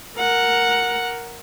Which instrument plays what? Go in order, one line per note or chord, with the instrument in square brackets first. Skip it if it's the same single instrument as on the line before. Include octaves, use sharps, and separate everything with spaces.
[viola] A#4 F#5